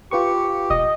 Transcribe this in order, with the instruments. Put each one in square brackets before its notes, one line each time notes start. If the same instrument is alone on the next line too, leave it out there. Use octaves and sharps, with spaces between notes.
[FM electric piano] F4 B4 C#6 [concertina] G4
[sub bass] E1 [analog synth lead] D#5